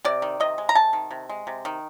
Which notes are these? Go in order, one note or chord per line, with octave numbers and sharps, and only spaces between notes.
C3 D5
D#3
C3 D#5
G#3
A#5
C3 A5
D#3
C3
G#3
C3
D#3